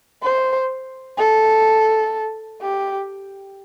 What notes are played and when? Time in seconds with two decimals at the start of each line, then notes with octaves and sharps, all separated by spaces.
0.23 C5
1.18 A4
2.62 G4